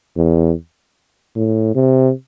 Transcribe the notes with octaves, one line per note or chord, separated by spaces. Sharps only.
E2
A2
C3